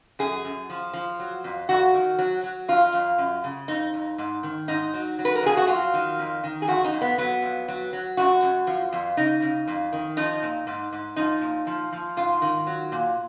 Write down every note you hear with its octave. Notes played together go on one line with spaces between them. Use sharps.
F#2 G#4
F#2
F3
F3
F#3
F2
F2 F#4
D#3
F#3
F#3
F2 F4
F2
F#2
C#3
F2 D#4
F2
G#2
D#3
G#2 D#4
F#3
F#3
B4
A#4
F2 G#4
F#4
F#3 F4
D#3
F2
D#3
G#4
F2 F#4
D#4
F2
B3
F#3 B3
F2
F#3
F#3
F#2 F#4
F#2
F3
F2
C#3 D#4
C#3
F2
D#3
F3 D#4
A#2
G#2
G#2
F3 D#4
A#2
F3
F3
G#2 F4
D#3
F#3
A#2